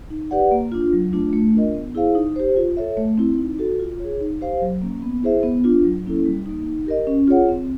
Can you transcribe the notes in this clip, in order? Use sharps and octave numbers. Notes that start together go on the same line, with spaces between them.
D#4
G4 B4 D5 F#5
A#3
D4 F4
F#3
A3 D4 F4
A3
D4 F4 A#4 D#5
B3
E4 G#4 C5 F5
D#4
G4 C5
F4
A4 C#5 E5
A3
C4 E4
D#4
F#4 A4
F4
G#4 C#5
D#4
G4 C5 F5
F#3
A#3 C#4
B3
E4 G#4 C5 E5
B3
D4 F4
F#3
A#3 C#4 E4 A4
G3
A#3 D#4
D#4
G4 A#4 D#5
C#4
F4 G#4 C#5 F#5
C4